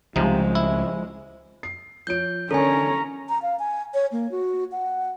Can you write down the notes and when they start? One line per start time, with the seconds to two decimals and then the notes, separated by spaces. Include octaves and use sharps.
0.16 C#2 C3 F3 G3 G#3 D#4
0.55 E4
1.63 C7
2.07 F3 C#5 G6 D7
2.51 D3 C#4 A4 A#4 C#5 G#5 A#5
3.29 A#5
3.42 F5
3.59 G#5
3.94 C#5
4.12 A#3
4.31 F#4
4.72 F#5